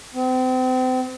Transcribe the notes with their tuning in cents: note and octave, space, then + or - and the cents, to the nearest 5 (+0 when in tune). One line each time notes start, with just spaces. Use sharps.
C4 -35